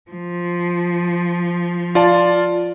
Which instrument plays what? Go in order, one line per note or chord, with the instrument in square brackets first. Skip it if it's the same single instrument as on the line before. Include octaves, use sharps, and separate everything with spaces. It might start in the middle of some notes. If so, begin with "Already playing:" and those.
[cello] F3
[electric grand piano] F4 D5 A5